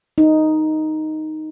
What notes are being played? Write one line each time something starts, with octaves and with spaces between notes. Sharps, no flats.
D#4